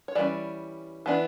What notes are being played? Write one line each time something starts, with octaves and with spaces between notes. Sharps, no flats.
C#5
E3 G3 C#4 D5
E3 B3 D4